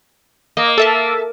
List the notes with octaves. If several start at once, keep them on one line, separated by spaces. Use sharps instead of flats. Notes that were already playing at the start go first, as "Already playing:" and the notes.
A#3 D#5
A4 E5 A5